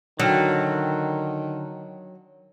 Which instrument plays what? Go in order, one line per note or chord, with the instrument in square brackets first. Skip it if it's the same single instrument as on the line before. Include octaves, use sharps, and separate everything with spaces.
[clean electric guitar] D3 [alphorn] D#3 [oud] F#3 [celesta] G5 F6 C#7